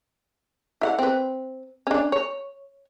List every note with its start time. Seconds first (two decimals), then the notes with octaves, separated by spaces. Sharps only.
0.81 E4 F5 F#5
0.99 C4 B4
1.87 C#4 D4
2.12 C#5